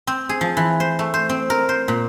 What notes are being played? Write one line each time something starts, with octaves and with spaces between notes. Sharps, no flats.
C4
G#4
F3
E3
C5
A3
C5
C4
A#4
C5
A#2